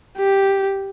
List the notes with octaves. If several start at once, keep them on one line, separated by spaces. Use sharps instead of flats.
G4